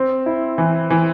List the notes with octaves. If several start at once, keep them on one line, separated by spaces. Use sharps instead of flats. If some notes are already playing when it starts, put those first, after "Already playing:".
Already playing: C4
E4
E3
E3